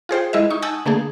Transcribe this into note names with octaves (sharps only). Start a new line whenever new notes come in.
F4 G#4 C5 G5
G#3 E4 D#5 E5
D#4 C#6
F#5 G#5 A5 D#6 E6 G6
D3 A3 A#3 G#4